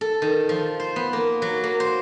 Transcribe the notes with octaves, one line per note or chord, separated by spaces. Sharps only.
A4
D#3
F3
C5
B3
A#3
F#3
A#3
C5